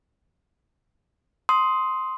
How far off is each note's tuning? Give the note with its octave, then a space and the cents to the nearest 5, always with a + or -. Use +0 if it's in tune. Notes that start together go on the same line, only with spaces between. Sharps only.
C6 +0 D#6 +15